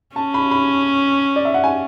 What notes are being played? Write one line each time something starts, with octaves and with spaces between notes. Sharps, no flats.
C#4 A5
B5
B5
D5
E5
F#5
G#5